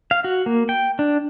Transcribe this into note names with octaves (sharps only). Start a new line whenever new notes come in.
F5
F#4
A#3
G5
D4